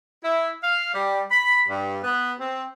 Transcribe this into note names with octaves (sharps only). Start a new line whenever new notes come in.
E4
F5
G3
B5
G2
B3
C4